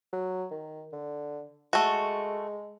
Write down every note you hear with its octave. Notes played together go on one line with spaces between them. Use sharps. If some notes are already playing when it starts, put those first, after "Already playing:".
F#3
D#3
D3
G#3 A3 F#4